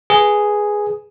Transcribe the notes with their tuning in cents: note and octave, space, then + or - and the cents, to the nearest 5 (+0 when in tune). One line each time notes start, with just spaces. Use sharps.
G#4 +0 B4 -5